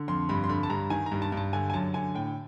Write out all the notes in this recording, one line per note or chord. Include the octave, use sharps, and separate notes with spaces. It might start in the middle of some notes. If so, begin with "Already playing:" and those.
Already playing: D3
F2 C6
G2 B5
C6
D3 B5
A5
G2 A#5
D#3 G#5
A#5
G2
A5
G2 A5
D3 G#5
G#5
F#2 A5
D3 G#5
A2 G5